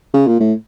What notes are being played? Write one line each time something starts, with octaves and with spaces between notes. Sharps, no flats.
C#3
A#2
A2